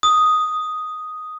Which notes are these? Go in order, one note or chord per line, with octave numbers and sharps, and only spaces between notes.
D#6